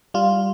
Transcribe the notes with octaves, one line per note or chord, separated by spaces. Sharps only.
G3 F4